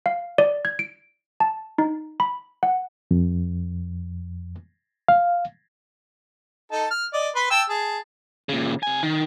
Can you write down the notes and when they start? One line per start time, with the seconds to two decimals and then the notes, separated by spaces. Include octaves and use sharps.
0.06 F5
0.38 D5
0.65 G#6
0.79 D7
1.40 A5
1.78 D#4
2.20 B5
2.63 F#5
3.11 F2
5.08 F5
6.72 D#4 A4 A5
6.91 F6
7.13 D5 D#5
7.35 B4 B5 C6
7.50 G5 A5 E6
7.69 G#4 A5
8.49 A#2 C#3
8.83 C3 G#5
9.03 D#3